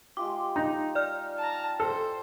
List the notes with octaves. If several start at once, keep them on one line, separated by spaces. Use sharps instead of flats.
G#3 F4 G4 D6
D#4
D5 F6
A5 A#5
A4 C5